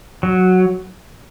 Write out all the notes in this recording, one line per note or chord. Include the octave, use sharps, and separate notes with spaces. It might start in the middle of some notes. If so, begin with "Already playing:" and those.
F#3